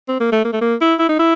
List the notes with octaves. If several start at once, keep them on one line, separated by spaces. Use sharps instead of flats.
C4
A#3
A3
A#3
A3
A#3
E4
E4
D#4
E4